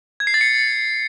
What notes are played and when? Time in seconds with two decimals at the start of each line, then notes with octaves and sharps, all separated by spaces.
0.20 G#6
0.27 C7
0.34 A6
0.41 C#7